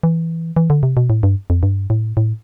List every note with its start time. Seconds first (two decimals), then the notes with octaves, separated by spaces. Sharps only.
0.03 E3
0.56 E3
0.70 D3
0.83 C3
0.97 B2
1.10 A2
1.23 G2
1.50 F2
1.63 G2
1.90 A2
2.17 A2